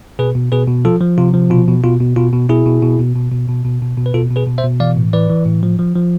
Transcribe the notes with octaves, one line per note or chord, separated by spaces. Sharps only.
B2 G#4 B4
B2
B2 G#4 B4
B2
F3 F4 A4
F3
C3 F4
F3
B2 F4
B2
B2 F4
B2
B2 F4
B2
B2 E4 G#4
B2
B2
B2
B2
B2
B2
B2
B2
B2
B4
B2 F4 A4
B2
G#4 B4
B2
C5 E5
B2
E3 D5 F5
A2
E3 B4 D5
E3
A2
F3
F3
F3